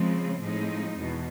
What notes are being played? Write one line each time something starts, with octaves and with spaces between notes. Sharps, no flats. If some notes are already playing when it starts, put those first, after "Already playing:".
Already playing: C#3 F3 G#3 C4
A2 F3 G#3 C4 D#4
E2 B2